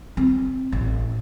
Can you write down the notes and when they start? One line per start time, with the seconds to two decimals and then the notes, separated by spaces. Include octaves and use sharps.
0.17 C4
0.72 A1